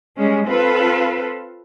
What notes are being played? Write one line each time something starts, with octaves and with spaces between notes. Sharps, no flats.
G3 G#3 C#4
C4 F4 A4 B4